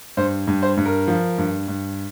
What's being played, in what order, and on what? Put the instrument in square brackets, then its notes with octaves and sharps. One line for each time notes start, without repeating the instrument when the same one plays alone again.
[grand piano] G2 C5
G2
C5
G2
A#4
F3
G2
G2